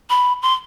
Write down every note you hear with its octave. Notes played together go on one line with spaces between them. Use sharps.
B5
C6